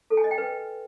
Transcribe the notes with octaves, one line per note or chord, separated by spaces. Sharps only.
A4
G#5
D#5
G5
B4